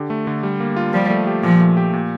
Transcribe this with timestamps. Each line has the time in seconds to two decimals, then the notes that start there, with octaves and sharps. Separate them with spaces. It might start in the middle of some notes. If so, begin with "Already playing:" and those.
Already playing: D3 G4
0.10 A3
0.27 D3
0.43 G3
0.60 A#3
0.76 F4
0.93 F3 G3
1.10 A3
1.27 G4
1.43 A#2 F3
1.60 A3
1.77 G4
1.93 A#2